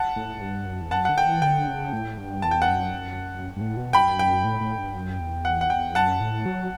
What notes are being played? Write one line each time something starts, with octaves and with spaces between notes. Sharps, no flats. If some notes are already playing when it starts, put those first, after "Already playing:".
Already playing: F#5 A5
A2
A2
G2
F#2
E2
F#2 F#5 A5
D3 F#5
G5
E3
D3 G5
C#3
A2
G2
E2 A5
G5
F#5 A5
F#2
G2
A2
B2
F#2 G5 B5
G5
A2
A2
G2
F#2
E2
F#5
F#5
G5
F#2 F#5 A5
A2
F#3